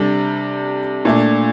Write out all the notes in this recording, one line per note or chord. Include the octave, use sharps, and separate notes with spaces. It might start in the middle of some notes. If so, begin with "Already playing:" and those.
Already playing: C3 G3 D4 A4
A#2 A3 D4